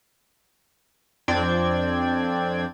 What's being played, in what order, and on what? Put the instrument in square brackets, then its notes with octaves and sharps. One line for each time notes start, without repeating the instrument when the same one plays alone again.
[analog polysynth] F2 C4 D4 D5 G5 G#6